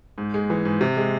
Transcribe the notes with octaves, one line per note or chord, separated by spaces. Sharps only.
G#2
G#3
E3
G#2
C3
G#3